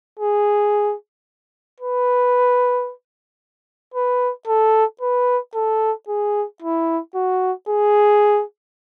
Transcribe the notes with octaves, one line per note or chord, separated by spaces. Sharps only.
G#4
B4
B4
A4
B4
A4
G#4
E4
F#4
G#4